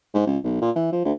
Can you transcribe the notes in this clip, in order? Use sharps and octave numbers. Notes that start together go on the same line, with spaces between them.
G#2
C#2
B1
A#2
E3
F3
D2